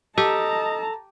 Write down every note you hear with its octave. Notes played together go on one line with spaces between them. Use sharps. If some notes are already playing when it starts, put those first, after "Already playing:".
G4 A4 D#5 A5 A#5